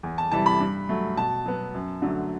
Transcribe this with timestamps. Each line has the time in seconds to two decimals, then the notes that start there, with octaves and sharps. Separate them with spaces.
0.03 E2
0.18 A5
0.32 C3 E3 G3 A5
0.46 B5
0.60 G2
0.89 F#3 A3
1.17 B2 A5
1.46 F#3 B3
1.74 F#2
2.02 D3 F#3 A3